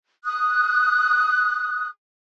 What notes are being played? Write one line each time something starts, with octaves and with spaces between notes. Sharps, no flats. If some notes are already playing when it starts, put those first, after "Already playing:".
D#6 F#6